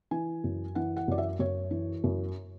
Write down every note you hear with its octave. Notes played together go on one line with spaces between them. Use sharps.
E3 G#5
F#2
E3 F#5
F#5
F#2 D5
E5
F#2 C#5
E3
F#2